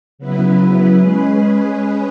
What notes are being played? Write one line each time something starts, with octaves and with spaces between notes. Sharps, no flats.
C#3 F#3 B3 E4 B4
G#3 C#4 G#4 B4